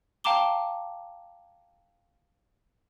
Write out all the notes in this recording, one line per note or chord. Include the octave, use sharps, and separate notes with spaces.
F5 G5 A5 A#5 D6 G7